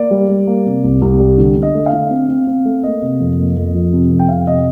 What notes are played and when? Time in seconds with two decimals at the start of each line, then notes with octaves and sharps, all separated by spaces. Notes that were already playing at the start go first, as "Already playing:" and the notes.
Already playing: A#3 D5
0.11 G3
0.29 G3
0.47 A#3
0.66 C3
0.84 C2
1.01 C2
1.20 G3
1.38 D3
1.56 D3
1.62 D#5
1.74 A3
1.86 F5
1.93 D3
2.11 C4
2.29 C4
2.47 C4
2.65 A3
2.83 A#3 D#5
3.02 C3
3.20 F2
3.38 A#3
3.56 F2
3.74 F3
3.93 C3
4.11 F2
4.19 G5
4.29 C3 F5
4.47 C3 D#5